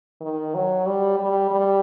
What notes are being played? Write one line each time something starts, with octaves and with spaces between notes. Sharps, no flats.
D#3
F#3
G3
G3
G3